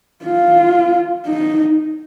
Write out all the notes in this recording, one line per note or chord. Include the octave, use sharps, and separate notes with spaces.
F4
D#4